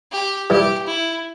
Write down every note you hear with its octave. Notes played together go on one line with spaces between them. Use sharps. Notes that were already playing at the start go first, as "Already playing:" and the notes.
G4
E3 G3 G4
E4